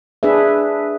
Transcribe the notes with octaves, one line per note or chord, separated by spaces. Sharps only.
D4 G#4 B4 E5